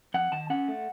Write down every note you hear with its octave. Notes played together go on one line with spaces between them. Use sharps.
F2 F#5
D#3 A5
C#4 F#5
A3